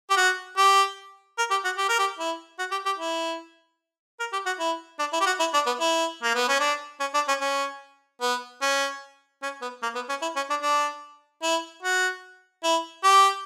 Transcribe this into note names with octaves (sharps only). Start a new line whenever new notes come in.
G4
F#4
G4
A#4
G4
F#4
G4
A#4
G4
E4
F#4
G4
G4
E4
A#4
G4
F#4
E4
D4
E4
G4
F#4
E4
D4
B3
E4
A#3
B3
C#4
D4
C#4
D4
C#4
C#4
B3
C#4
C#4
B3
A#3
B3
C#4
E4
C#4
D4
D4
E4
F#4
E4
G4